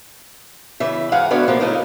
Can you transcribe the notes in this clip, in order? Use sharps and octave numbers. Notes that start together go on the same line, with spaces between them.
C#3 E3 E5
G#2 E3 G#4 F5 F#5
D3 B3 F#4 C#5
C3 F3 A#3 B3
A2 C#3 F#3 D#4 E4